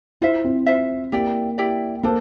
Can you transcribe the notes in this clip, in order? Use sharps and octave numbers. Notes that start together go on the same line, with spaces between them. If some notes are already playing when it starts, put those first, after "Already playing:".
E4 F4 C5 E5
C4
F4 C5 E5
A#3 E4 G4 D5 G5
E4 G4 D5 G5
A#3 D4 A4 C5